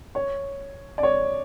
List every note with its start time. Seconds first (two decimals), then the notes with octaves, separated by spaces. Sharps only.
0.15 C#5
0.98 D5
1.03 C#5